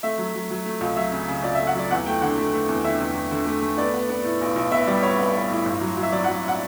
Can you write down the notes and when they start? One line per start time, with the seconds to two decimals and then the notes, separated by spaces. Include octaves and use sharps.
0.03 A3 E5
0.18 F#3
0.34 F#3
0.50 F#3
0.65 A3
0.81 C#2
0.96 F#3 E5
1.12 C#3
1.28 C#3
1.43 C#2 D5
1.55 E5
1.59 A3
1.67 F#5
1.75 F#3 D5
1.91 E2 F#5
2.06 A3 G5
2.21 D3 F#5
2.37 A3
2.53 A3
2.68 E2
2.84 D3 E5
3.00 E2
3.15 E2
3.31 D3
3.46 A3
3.62 A3
3.78 B3 D5
3.94 B3
4.09 B3
4.24 A2
4.41 B1
4.56 B1
4.71 B3 E5
4.87 G3 D5
5.03 B3 C#5
5.18 B3
5.34 B3
5.50 A2
5.66 G1
5.81 F#3
5.97 F#3
6.03 E5
6.12 F#3 D5
6.24 F#3 F#5
6.48 F#5